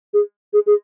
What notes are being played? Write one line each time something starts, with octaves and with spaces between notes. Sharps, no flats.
G#4
G#4
G#4